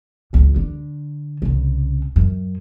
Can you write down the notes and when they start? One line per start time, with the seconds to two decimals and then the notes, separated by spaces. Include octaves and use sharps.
0.33 G#1 C#2
0.56 D3
1.42 C2 C#3
2.16 F#2